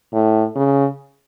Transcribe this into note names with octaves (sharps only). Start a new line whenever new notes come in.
A2
C#3